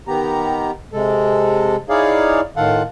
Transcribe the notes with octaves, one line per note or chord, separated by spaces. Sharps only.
D#3 B3 G4 A#5
C3 G#3 A4
D#4 E4 G#4 C#5 D5 F5
A2 D#3 F4 A4 F5 F#5